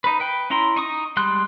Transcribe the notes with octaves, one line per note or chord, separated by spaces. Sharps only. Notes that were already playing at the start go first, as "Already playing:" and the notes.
D#4 B4
B4 G5
C#4 E4 A#5 C6
D#4 C#6 D#6
G3 G#3 C6 F#6